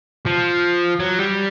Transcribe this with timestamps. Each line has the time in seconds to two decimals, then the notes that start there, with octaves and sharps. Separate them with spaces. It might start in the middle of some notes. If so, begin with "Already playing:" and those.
0.26 F3
1.00 F#3
1.19 G3